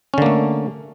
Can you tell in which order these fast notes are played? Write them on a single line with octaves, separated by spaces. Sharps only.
C#4 D3 A#3 A3